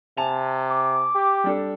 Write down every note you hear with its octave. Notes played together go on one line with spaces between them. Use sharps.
C3 G#5 A5 F7
D6
G4
G3 D4 A4